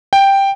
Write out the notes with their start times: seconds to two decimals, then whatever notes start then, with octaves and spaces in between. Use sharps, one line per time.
0.13 G5